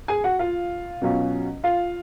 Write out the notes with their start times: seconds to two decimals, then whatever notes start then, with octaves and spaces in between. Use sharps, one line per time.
0.08 G#4 G#5
0.24 F#4 F#5
0.39 F4 F5
1.01 B2 F#3 C#4 F4
1.64 F4 F5